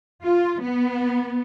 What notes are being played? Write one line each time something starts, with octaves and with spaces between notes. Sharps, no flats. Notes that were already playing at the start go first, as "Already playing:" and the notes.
F4
B3